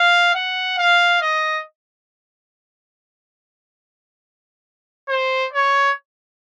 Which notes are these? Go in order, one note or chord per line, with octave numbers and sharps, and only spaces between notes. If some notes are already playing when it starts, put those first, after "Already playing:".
Already playing: F5
F#5
F5
D#5
C5
C#5